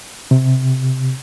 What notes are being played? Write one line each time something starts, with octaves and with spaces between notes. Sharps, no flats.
C3